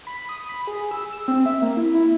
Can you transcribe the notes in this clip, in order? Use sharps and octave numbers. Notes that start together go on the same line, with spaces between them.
B5
D#6
B5
G#4
E6
E6
C4
E5
A#3
E4
E4